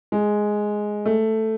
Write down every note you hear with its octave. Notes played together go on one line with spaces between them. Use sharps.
G#3
A3